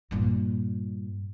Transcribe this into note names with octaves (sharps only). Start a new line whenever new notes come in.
G2 A#2